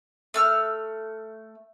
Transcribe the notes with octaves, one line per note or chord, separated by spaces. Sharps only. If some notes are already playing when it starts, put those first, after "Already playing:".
A3 E6 F6